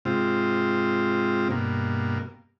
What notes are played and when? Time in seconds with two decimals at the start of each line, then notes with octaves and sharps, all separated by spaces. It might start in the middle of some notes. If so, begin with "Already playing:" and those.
0.05 G#2 C3 C4 F4
1.50 G2 B2 A#3